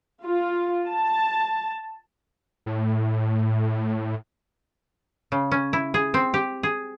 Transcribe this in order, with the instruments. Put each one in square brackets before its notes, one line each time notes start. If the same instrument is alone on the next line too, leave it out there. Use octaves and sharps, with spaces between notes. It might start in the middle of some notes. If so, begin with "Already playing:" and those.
[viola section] F4
A5
[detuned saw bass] A2
[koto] C#3
C#4
E4
G#4
C4
G4
G#4